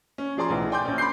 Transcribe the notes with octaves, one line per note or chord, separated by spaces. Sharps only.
C#4
F3 G#4 D5 A#5 C6
B1 A2 E3
D5 G5 G#5 C6 D6 G6
A#1 C#4
B5 C6 D6 G6 C7